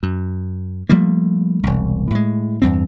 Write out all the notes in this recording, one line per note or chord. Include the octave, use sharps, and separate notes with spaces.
F#2
F3 G3 A3 A#3
E1 C2
A2 G#3
E2 G2 C4